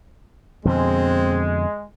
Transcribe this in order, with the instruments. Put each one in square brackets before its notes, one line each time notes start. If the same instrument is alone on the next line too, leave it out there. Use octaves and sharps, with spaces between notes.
[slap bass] F2 B2 D3 [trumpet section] G#3 [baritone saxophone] C4